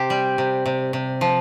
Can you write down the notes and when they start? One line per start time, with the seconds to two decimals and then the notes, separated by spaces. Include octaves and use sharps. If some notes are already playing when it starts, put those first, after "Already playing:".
Already playing: C3 G4 C5
0.10 G3
0.38 C3
0.66 C3
0.93 C3
1.21 F3